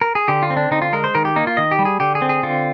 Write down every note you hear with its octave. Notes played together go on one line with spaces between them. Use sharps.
A#4
G#4
D3 G4
F4
C4
D4
D3 D#4
F4
G#3 A#4
C5
D#3 A#4
G4
A#3 D#4
F4
D#3 D#5
G4
G3
G#4
D3 G4
G#4
C4
G#4
D3 F4